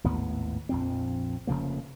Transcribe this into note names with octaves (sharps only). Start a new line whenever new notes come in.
G#1 D#2 A2 B3
A#1 F2 C4
F1 C#3 F3 A#3